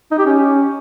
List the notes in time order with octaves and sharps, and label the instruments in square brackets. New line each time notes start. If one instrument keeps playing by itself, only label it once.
[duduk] D#4
G4
C#4